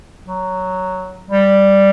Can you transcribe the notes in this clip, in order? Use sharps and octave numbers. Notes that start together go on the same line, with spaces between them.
F#3
G3